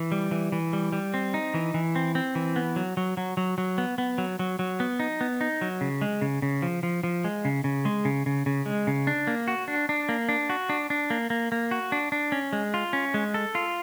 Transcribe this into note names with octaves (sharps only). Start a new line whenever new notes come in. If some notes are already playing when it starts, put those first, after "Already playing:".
Already playing: E3
G3
E3
E3
G3
G3
C4
D#4
E3
E3
C4
C4
E3
B3
F#3
F#3
F#3
F#3
F#3
B3
B3
F#3
F#3
F#3
B3
D#4
B3
D#4
F#3
C#3
G#3
C#3
C#3
F3
F3
F3
G#3
C#3
C#3
G#3
C#3
C#3
C#3
G#3
C#3
D4
A#3
F#4
D4
D4
A#3
D4
F#4
D4
D4
A#3
A#3
A#3
F#4
D4
D4
C#4
G#3
F4
C#4
G#3
A4
F4